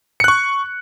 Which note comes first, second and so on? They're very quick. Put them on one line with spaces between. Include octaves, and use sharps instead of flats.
C#7 F#6 C#6